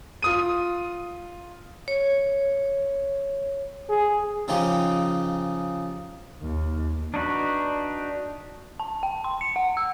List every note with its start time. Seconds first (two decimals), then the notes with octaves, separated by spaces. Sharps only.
0.22 F4 D#6 D#7
1.88 C#5
3.89 G#4
4.48 C#3 F3 D#4 G4
6.42 D#2
7.14 D4 D#4 F#4 B4
8.80 A5
9.03 G5
9.24 C6
9.41 C#7
9.56 F#5
9.77 E6